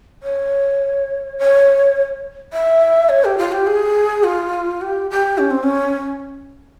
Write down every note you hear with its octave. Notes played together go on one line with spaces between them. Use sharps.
C#5
C#5
E5
C#5
G4
F4
G4
G#4
F4
G4
G4
C#4
C4
C#4